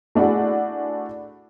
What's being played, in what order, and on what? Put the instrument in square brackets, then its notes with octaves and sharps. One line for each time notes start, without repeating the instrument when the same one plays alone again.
[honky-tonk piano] A3 D4 E4 F#4 G#4